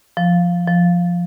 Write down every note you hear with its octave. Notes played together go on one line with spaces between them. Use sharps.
F3
F3